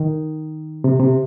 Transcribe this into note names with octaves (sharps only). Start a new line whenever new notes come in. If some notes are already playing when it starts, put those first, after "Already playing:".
Already playing: D#3
C3
C3